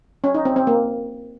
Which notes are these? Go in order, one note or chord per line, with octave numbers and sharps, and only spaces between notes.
C#4
D#4
C4
C4
A#3